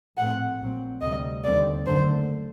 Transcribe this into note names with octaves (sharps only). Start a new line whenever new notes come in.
A#1 A2 A3 C4 F#5
A#1 A#2 F#3 C4
D2 C3 G3 D#5
D#2 D3 G3 C4 D5
F#1 F#2 D3 A3 C5